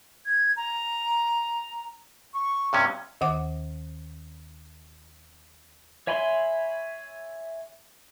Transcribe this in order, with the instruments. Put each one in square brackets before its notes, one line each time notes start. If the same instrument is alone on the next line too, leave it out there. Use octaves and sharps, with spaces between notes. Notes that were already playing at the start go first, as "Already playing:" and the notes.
[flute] G#6
A#5
C#6
[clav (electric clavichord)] G2 C3 C#4
[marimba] D#2 D#3 F#5 D6
[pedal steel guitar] C#5 E5 G#5 B5 C6